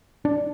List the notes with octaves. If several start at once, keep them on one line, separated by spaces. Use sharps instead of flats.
D4